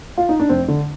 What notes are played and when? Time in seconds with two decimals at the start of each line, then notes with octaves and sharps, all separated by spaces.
0.18 F4
0.29 D#4
0.40 D4
0.49 F1 C4
0.68 D3